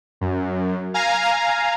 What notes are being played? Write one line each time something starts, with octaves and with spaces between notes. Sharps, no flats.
F#2
F5 G#5 A#5